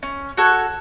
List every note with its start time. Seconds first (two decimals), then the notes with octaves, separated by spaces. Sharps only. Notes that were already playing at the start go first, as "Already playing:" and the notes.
0.03 C#4
0.37 F#4 A4 C#5